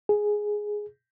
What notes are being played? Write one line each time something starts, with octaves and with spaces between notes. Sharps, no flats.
G#4